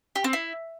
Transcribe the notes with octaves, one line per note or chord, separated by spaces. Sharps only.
G4
C4
E4